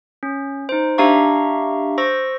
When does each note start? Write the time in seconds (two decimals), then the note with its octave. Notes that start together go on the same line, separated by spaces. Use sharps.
0.23 C#4
0.69 D#4 C5
0.98 D4 G4 E5 F5 A#5 C#6
1.98 C5 C#6 E6 A#6